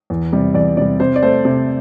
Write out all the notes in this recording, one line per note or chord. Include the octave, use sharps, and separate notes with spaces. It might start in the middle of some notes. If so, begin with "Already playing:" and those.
E2
C3 G3
E2 D5
C3 G3 D5
C3 C5
D5
A3 C5
C3